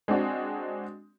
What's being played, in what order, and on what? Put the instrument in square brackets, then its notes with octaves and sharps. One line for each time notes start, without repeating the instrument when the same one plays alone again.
[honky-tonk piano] G#3 C4 D4 F#4